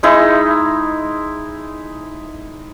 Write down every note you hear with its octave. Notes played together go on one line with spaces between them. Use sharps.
G#3 D#4 E4